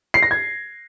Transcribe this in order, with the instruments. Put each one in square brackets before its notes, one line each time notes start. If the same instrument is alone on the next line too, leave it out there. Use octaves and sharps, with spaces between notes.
[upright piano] C7
A#6
G#6